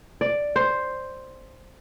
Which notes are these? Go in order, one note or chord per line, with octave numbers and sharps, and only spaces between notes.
D5
C5